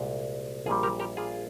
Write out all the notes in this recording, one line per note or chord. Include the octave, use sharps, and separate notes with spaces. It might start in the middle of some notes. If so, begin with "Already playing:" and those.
Already playing: C2 A#2 G#3
A#1 A#2 G3 F4 G#4
G4 A#4
G4 A#4
F4 G#4